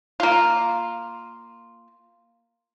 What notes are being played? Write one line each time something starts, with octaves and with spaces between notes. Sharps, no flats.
A#3 F4